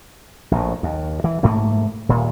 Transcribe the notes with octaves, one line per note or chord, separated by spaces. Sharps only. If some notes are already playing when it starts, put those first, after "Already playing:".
A#1 A2
D#2
E3
G#2 A3 A#3
D#1 A#2